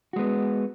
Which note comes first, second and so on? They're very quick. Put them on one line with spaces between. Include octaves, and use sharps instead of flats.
F#4 G#3 B3